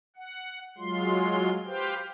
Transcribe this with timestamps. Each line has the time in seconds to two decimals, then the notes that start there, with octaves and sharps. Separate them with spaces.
0.16 F#5
0.78 F#3 G#3 F4 C6
1.66 G4 B4 C5 F5 G5